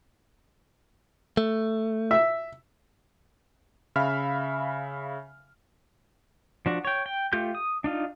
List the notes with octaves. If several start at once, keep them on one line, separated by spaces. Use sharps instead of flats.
A3
E5
C#3 E5 F5 B5 F6
F3 D4 F#4
C#5 G5
G5
A3 F4 G4 G6
D#6
D4 D#4 F4